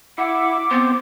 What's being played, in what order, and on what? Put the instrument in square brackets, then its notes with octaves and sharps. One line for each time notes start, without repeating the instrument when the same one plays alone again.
[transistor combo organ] E4 [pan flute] F#5 [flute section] D6
[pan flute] B3 [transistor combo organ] C4